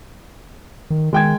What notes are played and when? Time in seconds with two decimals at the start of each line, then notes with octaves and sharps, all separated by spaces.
0.90 D#3
1.13 D#3 G#3 G5 G#6